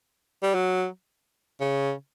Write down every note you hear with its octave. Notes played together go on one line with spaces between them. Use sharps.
G3
F#3
C#3